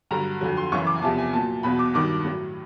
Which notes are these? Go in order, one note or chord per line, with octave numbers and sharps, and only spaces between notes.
G2 D3 F#3 A#5
F2 D3 F#3
C6
F#2 C#3 E3 C#6
D6
G#5
E2 C3 F3 A5
G#5
A#2 F#3 A5
E2 B2 F#3 B5
D6
G2 D#3 F#3 D6
A2 F#3